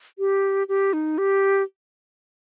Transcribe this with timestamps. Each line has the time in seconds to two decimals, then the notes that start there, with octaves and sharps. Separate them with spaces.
0.19 G4
0.69 G4
0.93 D#4
1.18 G4